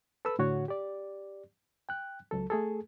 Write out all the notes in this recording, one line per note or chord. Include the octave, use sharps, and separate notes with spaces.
A4 B4 B5 E6
A2 D3 F#4 C#5 F#5
G4 D5
G5 F#6
C#2 F#3 A4
A3 G#4 A4